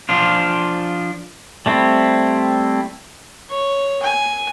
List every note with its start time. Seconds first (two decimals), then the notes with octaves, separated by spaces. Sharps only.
0.09 F3 D4 F4
1.66 G3 A3 C4 E4
3.50 C#5
4.03 G#5